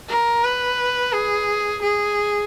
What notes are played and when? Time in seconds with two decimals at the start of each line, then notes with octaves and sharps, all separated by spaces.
0.09 A#4
0.43 B4
1.12 G#4
1.82 G#4